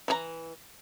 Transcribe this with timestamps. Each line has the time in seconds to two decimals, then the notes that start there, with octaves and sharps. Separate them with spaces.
0.08 E3 G#4 A#5